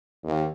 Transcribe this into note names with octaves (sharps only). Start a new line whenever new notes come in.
D#2